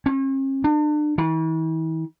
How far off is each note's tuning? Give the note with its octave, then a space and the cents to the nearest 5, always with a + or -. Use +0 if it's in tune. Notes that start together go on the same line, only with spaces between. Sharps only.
C#4 -45
D4 +35
E3 -40